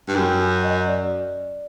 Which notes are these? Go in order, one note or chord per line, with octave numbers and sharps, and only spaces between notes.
G2
F#2 G5
G#5
D#5
D5